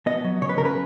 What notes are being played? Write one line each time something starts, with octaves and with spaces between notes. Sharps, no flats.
B3 D#5
F#3
C#3 C#5
B4
C#3 A#4
B4